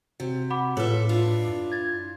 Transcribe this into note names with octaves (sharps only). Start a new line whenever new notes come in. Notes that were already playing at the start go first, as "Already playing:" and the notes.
C3 F#4
F#5 B5 D6
A2 F4 A4 B4 C#5 E5
D4 E4 F4
F#2
G#6 A6